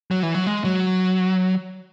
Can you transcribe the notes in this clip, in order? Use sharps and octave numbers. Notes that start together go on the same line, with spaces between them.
F#3
E3
F#3
G#3
F#3